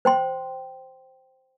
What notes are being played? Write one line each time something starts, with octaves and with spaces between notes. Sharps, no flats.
C5 G5 C6